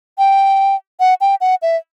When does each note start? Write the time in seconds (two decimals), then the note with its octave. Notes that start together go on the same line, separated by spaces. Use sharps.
0.18 G5
1.00 F#5
1.21 G5
1.41 F#5
1.62 E5